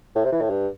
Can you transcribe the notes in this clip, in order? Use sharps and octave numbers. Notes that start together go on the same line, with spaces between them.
A2
C3
E3
A2
G2